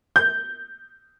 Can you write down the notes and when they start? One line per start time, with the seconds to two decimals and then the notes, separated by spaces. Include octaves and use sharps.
0.16 G6